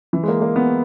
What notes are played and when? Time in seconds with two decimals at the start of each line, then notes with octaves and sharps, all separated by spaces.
0.13 E3
0.23 G#3
0.28 A#3
0.42 A#3
0.56 B3